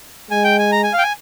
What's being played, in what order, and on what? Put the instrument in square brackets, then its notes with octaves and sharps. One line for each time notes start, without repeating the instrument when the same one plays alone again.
[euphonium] G#3 [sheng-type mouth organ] G#5
[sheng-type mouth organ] G5
G#5
A#5
G#5
F5
G5
G#5